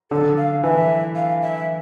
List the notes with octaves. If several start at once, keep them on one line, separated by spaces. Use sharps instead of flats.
D3 A4
F5
E3 E5
F5
E5